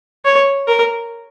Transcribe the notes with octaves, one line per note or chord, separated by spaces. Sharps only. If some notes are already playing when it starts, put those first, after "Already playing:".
C#5
A#4